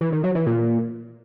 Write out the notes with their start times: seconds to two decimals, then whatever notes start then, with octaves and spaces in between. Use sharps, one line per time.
0.01 E3
0.12 D#3
0.24 F#3
0.35 E3
0.46 A#2